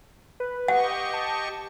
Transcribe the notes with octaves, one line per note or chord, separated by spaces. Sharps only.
B4
G4 D#5 F#5 C#6
A5